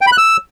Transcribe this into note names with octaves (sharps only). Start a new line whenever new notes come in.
G5
B5
F#6
E6